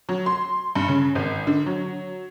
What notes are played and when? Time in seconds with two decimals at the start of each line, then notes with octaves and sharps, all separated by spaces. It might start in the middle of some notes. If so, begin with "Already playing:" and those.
0.09 F#3
0.26 C6
0.75 G2
0.88 C#3
1.15 G#1
1.47 D3
1.66 F#3